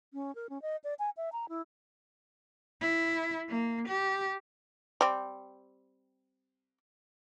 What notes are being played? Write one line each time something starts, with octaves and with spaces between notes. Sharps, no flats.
C#4
A#4
C#4
D#5
D5
G#5
E5
A#5
E4
E4
A#3
G4
G3 C4